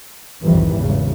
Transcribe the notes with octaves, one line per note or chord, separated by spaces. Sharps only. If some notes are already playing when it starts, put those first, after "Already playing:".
B1 F2 G#2 D#3 E3 G3
G#1 E2 C#3